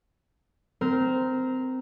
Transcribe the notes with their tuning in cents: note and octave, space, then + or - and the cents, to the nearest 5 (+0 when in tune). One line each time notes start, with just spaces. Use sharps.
C4 -20 A#4 +0